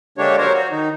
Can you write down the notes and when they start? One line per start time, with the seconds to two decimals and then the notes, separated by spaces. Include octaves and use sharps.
0.18 D3 G#3 A#3 D4 G4 C#5
0.38 F#3 A#4 C5 C#5
0.54 F#4
0.71 D#3 D#4